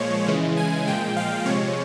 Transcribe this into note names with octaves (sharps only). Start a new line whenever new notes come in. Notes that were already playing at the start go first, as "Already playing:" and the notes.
Already playing: A#2 F3 G#3 C#5
C#3 E3 G#3
G#5
A#2 F3 G#3 G5
F5
C3 F3 G#3 C#5